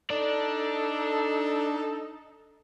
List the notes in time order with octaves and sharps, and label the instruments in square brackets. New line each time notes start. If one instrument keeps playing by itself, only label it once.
[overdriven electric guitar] D4 D5 [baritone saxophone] D#4 [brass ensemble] A4